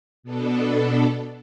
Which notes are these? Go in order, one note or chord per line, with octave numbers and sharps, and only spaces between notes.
B2 B3 D4 A4